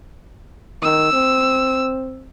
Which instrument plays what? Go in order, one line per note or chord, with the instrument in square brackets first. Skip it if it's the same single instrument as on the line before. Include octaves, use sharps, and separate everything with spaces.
[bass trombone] D#3 [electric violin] E6
[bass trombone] C4